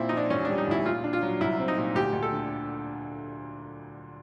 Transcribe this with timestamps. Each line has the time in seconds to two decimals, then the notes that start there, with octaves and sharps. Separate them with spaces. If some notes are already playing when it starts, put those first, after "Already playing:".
Already playing: A#2 C4 E4
0.09 D#4
0.12 F3 D4
0.30 E1 C#4
0.45 D4
0.48 G3
0.58 D#4
0.67 D2 E4
0.85 A#2 F4
1.04 D4
1.13 F4
1.22 F#3
1.40 C2 E4
1.59 C4
1.68 D#4
1.76 A#2
1.95 D2 G4
2.13 D2
2.23 A4
2.32 D3